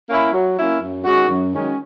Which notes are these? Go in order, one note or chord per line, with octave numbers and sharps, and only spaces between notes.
A#3 C#4 E4
F#3
A#3 C#4 E4
F#2
D#3 G#3 C#4 F#4
F#2
D#3 G#3 C#4 F#4